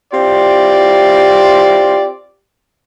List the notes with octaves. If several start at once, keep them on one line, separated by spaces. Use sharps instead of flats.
C4 E4 F4 G4 D5